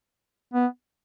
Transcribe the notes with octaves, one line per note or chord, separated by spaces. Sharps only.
B3